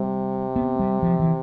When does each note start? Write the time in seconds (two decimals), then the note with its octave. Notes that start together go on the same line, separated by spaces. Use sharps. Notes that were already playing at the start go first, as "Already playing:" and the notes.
Already playing: C3 G3
0.56 B3
0.79 G3
1.03 F3
1.19 E3